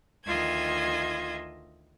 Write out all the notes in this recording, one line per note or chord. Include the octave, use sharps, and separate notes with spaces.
D2 D#3 F4 D#5 E5 G#6